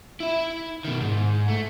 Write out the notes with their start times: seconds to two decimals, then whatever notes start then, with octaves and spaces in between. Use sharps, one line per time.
0.20 E4 E5
0.85 B2 D#3
1.02 G#2
1.48 A3